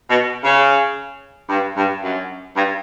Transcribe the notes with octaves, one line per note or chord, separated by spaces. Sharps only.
B2
C#3
G2
G2
F#2
G2